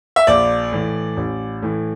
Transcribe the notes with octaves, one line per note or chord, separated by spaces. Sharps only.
E5
A#1 D5
A2 E3
A1
A2 E3